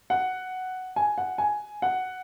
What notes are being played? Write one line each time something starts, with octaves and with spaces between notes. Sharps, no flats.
F#5
G#5
F#5
G#5
F#5